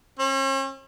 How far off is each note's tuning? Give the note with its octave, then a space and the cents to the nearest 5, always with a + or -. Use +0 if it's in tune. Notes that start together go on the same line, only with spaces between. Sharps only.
C#4 -45